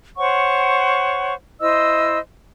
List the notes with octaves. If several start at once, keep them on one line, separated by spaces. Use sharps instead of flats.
C5 C#5 F#5 C#6
E4 C5 D#5 E6